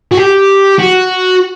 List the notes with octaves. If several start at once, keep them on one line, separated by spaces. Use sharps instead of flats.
F#4
G4
F#4